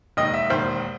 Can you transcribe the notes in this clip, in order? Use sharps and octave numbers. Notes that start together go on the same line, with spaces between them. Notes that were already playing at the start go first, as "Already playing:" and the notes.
E1 D#2 D#3 D#5
E5
E1 D#2 D#3 C5